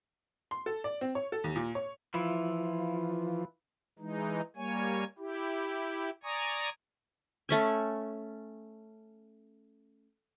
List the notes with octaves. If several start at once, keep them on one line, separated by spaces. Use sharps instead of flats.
C6
A4
D5
C4
C#5
A4
D#2
A#2
C#5
E3 F3 E4 F4
E3 G#3 D#4
G3 A#3 C#5 G#5
E4 G4
D5 G#5 A#5 C#6 D#6
A3 C#4 G#5